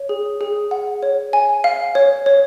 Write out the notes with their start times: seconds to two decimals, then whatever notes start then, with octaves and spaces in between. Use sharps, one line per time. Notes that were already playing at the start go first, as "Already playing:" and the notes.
Already playing: C#5
0.09 G#4
0.41 G#4
0.71 F#5
1.03 C#5
1.33 G#5
1.64 F5
1.95 C#5
2.26 C#5